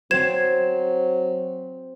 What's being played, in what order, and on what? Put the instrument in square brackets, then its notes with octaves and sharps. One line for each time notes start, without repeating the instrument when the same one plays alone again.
[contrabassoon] F#3 [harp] C4 C5 [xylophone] G#6 E7